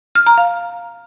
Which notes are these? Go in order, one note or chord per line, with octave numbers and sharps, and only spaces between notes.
F6
A#5
F5